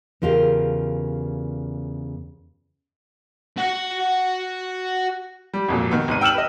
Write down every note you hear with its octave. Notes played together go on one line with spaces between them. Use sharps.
E2 C#3 F4 G4 A#4
F#4 F#5
G3
G#1 F2 A#2 F#3
D#3 B3
G#1 D#3 D#7
G5 E6 F6 E7 F#7
B4 D#5